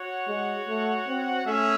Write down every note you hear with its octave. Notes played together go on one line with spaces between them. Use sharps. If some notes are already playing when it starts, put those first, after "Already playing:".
Already playing: F#4 C#5 F#5
G#3
A3
C4
A3 C#4 G#4 E5